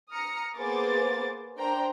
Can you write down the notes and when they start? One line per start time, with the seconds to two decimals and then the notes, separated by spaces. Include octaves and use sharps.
0.11 A#5 D#6 F6 A#6 C#7
0.57 A#3 B3 G#4 C5 D6 A6
1.57 D4 A#4 C5 G5 A#5